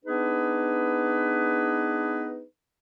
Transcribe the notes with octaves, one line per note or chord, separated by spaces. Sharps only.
B3 D4 D#4 G#4 B4